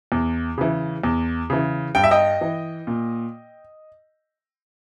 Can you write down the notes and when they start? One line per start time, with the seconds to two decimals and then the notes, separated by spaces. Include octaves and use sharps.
0.12 E2
0.58 C#3 E3
1.04 E2
1.50 C#3 E3
1.95 G2 G5
2.04 E5
2.11 D#5 G5
2.41 E3
2.87 A#2